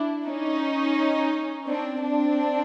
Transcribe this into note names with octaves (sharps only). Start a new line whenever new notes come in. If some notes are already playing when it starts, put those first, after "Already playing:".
Already playing: D4 E4
C#4 D#4
C4 D4
C4 D4